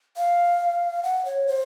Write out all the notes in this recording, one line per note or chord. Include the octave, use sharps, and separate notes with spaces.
F5
F#5
C#5
C5